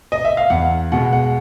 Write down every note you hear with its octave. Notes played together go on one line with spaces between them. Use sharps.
D#5
E5
F5
E2 F#5
B2 G#3 F#5
F#5